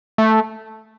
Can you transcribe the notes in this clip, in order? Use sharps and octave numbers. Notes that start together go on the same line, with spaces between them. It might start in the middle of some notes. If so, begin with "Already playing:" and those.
A3